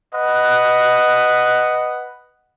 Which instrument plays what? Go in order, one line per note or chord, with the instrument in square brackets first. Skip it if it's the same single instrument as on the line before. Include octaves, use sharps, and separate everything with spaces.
[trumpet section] B4 D#5 F#5